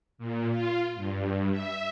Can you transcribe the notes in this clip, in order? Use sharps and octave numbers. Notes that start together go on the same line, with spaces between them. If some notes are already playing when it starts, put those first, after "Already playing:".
A#2
F4
G2
E5